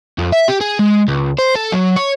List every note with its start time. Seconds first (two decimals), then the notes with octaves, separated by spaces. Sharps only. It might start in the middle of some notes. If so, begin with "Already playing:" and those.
0.18 F2
0.32 E5
0.49 G4
0.61 G#4
0.79 G#3
1.08 C#2
1.39 C5
1.55 A4
1.72 F#3
1.97 C#5